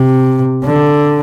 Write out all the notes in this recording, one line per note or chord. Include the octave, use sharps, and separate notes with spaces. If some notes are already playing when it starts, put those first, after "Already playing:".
Already playing: C3
D3